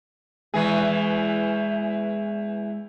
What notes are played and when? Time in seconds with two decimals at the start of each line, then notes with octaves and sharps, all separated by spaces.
0.54 E2 E3 G#3 G#4